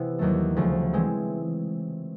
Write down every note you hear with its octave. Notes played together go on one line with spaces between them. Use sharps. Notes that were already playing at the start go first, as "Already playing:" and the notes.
Already playing: C3 E3 B3 G4
D#2 D#3 F#3 A3
D2 C#3 F3 A3
E3 G#3 C4